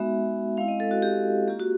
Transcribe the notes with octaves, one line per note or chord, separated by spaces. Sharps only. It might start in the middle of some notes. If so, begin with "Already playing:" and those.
Already playing: G#3 B3 D#4 F#4 E5
G#3 C4 E4 F5
D#5
A4
F#4
G4
A#3 C#4 F4 G4
F#4